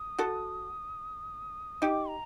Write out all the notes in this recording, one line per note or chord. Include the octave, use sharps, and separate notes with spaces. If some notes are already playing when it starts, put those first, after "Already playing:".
Already playing: D#6
F#4 A4
D#4 G4 D6
A#5